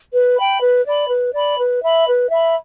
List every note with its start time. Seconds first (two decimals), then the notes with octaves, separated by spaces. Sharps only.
0.13 B4
0.37 G5 B5
0.61 B4
0.85 D5 B5
1.10 B4
1.34 D5 B5
1.58 B4
1.82 E5 B5
2.07 B4
2.31 E5 B5